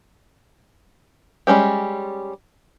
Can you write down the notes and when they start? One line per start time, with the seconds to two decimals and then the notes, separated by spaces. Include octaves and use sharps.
1.47 G3 G#3 C#4 G4